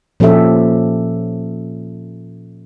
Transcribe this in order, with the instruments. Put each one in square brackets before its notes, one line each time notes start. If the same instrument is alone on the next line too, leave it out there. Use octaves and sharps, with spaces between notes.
[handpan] A#2 F3 C#4 G4 A4 E5